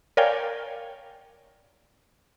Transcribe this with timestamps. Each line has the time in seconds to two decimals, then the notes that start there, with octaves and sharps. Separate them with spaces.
0.17 A#4 C#5 D5 F5 G5 G#5